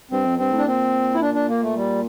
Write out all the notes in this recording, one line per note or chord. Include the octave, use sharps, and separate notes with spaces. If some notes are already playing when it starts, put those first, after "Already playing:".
G2 C4
F2
G2 C4
A2
D4
A#2 C4
E4
D4
D4
A#3
A3
G3